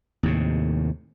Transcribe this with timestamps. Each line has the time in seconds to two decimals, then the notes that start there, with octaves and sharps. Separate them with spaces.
0.23 D#2 A2 C3